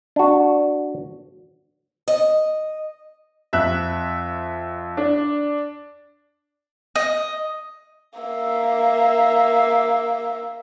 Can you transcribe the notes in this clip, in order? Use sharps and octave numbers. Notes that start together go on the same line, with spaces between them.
D4 F#4
D#5
F2 E5 F#6
D4
D#5
A#3 E5